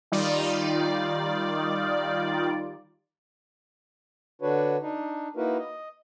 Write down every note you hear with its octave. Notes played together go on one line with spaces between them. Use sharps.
D#3 G3 D#4 F4 D5
D3 D4 F#4 B4 C#5
D4 D#4
A#3 D#4 E4 F#4 A#4 B4
D#5